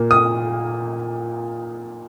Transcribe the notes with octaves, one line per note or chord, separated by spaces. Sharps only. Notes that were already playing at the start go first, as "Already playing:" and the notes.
Already playing: A#2 A#3
D#6